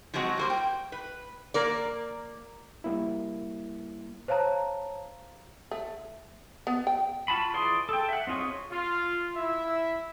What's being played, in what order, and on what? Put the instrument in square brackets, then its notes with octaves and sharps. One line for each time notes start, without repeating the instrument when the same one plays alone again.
[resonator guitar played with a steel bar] F3 F#3 G#3 C4 F#4
G3 A#3 C5
G5
B4
A#3 A#4 D5
[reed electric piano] G3 A#3 E4
[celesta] C5 C#5 F5 A5 A#5
[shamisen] A3
B3
G5
[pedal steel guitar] F4 F#4 A5 B5
E3 G#4 D5 C6
A4 G5
E5 F#5
C4 D#4 F4 G#4 C#5
[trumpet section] F4
E4 E5